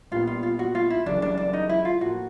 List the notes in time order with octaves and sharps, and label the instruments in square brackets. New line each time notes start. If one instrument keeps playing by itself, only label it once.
[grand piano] A#1 A#2 G3 B3 [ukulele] F4
[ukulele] F4
F4
F#4
F4
E4
[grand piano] F#1 F#2 C#3 E3 G3 [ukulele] D4
[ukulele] D4
D4
D#4
E4
F4
[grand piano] A2 F3 A#3 [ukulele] F#4